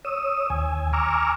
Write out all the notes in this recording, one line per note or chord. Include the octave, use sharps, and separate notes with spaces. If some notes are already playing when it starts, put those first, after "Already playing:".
C#5 D#6 E6
D#2 G#5
G#5 A#5 C#6 D6 E6 F6